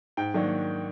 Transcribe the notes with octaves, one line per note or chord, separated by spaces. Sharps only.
G#2 G5
D#3 F#3 A#3 D4